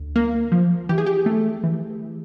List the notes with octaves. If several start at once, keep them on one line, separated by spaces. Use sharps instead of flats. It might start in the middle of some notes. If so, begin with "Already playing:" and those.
Already playing: D2
A#3
F3
E3 G4
G#4
G4
A3
E3